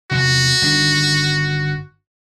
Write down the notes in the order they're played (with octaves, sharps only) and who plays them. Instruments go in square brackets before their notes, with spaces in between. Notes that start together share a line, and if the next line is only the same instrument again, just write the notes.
[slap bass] E2 C3 [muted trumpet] F#4
[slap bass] G1 D#3 D4